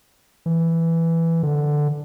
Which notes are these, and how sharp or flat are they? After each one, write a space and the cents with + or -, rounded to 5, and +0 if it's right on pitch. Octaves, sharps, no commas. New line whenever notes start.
E3 +5
D3 +5